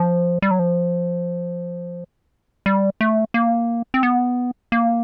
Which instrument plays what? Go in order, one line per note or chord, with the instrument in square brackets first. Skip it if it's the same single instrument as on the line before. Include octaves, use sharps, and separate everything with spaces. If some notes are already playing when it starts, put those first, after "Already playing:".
Already playing: [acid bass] F3
G3
F#3
F3
G3
A3
A#3
C4
B3
A#3